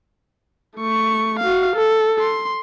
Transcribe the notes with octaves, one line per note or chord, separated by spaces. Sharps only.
A3 C#6
F#4 F5
A4
C6